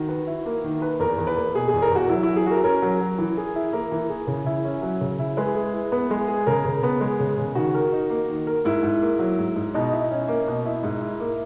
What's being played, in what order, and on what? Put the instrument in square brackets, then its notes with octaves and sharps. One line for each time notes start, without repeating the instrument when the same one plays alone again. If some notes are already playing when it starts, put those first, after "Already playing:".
Already playing: [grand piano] D#3 [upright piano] F#4
[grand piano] B4
E4
A#3
D#3
B4
[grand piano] E2 [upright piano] A#4
[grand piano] E2
[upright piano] B4
[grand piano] A#3
[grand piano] B2 [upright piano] G#4
[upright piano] G#4
[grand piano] E2
[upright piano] A#4
[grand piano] E2 [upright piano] F#4
[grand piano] F#3 [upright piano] E4
[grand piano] F#3 [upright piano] E4
[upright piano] G#4
[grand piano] F#4 [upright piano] A#4
[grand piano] C#4 [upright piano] A#4
[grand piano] F#3
F#3
E3
G#4
E4
[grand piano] A#3 [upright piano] A#4
[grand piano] E3
G#4
C#3
E4
C#4
F#3
C#3
E4
[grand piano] G#3 [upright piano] B4
[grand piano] G#4
E4
B3
G#3
G#4
[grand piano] C#3 [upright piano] A#4
[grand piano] C#3
B3
G#3
C#3
C#3
[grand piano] D#3 [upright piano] F#4
[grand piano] A#4
D#4
A#3
D#3
A#4
[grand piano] G#2 [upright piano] E4
[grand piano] G#2
A#3
F#3
G#2
G#2
[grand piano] B2 [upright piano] D#4
[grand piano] E4
C#4
A#3
B2
E4
G#2
E4
A#3